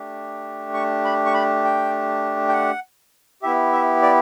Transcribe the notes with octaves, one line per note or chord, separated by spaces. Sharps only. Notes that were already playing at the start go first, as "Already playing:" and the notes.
Already playing: A3 D4 G4
C#6
B5
C#6
B5
G5
G5
F#5
B3 E4 G4 E5
E5
D5